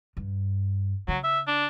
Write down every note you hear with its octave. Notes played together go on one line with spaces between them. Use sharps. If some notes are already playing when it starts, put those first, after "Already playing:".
G2
C#3 F#3
E5
D4